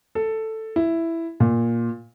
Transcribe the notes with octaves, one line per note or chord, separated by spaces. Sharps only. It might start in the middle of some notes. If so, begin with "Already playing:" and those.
A4
E4
A#2